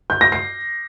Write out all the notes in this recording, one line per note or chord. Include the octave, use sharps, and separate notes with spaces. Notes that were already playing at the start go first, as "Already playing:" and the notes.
G6
A#6
C7